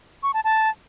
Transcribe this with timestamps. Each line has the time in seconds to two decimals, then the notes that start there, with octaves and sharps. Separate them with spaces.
0.23 C#6
0.34 A5
0.44 A5